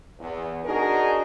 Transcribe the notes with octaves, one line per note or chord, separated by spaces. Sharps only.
E2
D4 D#4 F#4 G#4 A#4